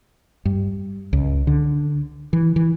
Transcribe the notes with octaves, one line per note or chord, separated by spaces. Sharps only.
G2
C#2
D3
E3
E3